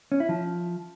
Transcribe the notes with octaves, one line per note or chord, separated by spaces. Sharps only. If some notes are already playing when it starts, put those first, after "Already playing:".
C#4
E4
F3